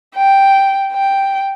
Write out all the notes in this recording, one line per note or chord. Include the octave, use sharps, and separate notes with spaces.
G5
G5